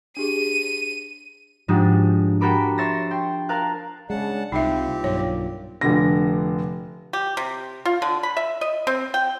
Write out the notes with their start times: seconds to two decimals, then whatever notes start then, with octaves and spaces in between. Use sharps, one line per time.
0.17 D4 G4 G#4 D#7
1.68 G#2 F3 G#3 D4 F#4 G4
2.41 F#4 G4 A4 A#4 B5 D6
2.78 C#5 E5 C6 A6 A#6
3.11 G5 C6
3.49 A#4 F5 A5 F#6
4.10 C#3 G#3 D4 F#5 A5
4.52 C2 A#2 C4 D#4 F4 G4 E5
5.04 B1 G2 C#5
5.81 F1 D3 A#6
7.13 G4
7.37 C3
7.85 F4
8.02 D3
8.23 B5
8.37 E5
8.61 D#5
8.87 C4
9.14 G5